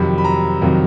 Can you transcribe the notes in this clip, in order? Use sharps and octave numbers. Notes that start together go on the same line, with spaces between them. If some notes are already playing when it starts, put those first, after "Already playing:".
Already playing: F2 C3 D#3 F#3 B5
B5
A#5
F2 C3 D#3 F#3